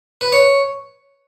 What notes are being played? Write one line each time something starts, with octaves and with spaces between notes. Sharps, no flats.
B4
C#5